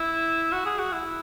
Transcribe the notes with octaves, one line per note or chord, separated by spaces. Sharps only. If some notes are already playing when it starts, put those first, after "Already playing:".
Already playing: E4
F#4
G#4
F#4
E4